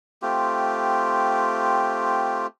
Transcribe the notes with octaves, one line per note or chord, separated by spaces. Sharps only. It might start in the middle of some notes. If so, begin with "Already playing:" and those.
A3 C4 F4 G4